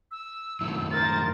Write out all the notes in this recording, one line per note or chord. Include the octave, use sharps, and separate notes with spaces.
E6
F#2 A2 D#3
A#4 C5 A6